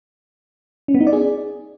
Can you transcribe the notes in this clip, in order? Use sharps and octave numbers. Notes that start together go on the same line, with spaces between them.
C#4
B3
D#4
D5
G#4